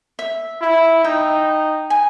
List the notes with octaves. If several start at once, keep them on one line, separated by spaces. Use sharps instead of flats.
E5
E4
D#4 G5
G#5